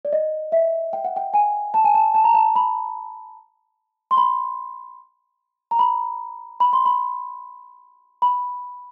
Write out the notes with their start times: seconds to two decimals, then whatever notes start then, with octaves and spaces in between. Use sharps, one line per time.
0.05 D5
0.13 D#5
0.52 E5
0.93 G5
1.05 F#5
1.16 G5
1.34 G#5
1.74 A5
1.84 G#5
1.94 A5
2.15 A5
2.24 A#5
2.34 A5
2.56 B5
4.11 C6
4.17 B5
5.71 A#5
5.79 B5
6.60 B5
6.73 C6
6.86 B5
8.22 B5